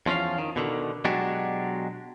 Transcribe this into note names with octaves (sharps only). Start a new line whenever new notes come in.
E2 F3 C#4 F4 F5
D#3
B2 D3 D#3
B2 F#3 G#3 D4 F#4 G4